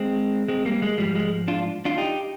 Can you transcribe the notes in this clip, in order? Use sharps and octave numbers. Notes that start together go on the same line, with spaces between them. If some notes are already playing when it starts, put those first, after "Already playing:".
Already playing: G#3 C4
G#3 C4
G3 A#3
G#3
G#2 F3 G3
G#3
D4 F4
D4 F4
D#4 G4